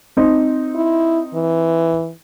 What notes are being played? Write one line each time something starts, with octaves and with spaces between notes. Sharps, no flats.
C4 D#4
E4
E3